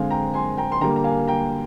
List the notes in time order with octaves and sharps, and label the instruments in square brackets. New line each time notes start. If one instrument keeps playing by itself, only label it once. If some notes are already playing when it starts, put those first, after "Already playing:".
Already playing: [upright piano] D3 G#3 C4 F5 G#5
G5 A#5
G#5 C6
G5 A#5
C6
D3 G3 A#3 G5 A#5
A#5
F5 G#5
G5 A#5